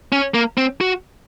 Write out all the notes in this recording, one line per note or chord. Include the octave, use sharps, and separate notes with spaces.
C#4
A#3
C4
F#4